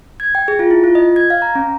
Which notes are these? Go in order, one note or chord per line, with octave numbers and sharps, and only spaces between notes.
G#6
G5
G#4
F4
E4
F4
D#5
G#6
F5
A#5
C#4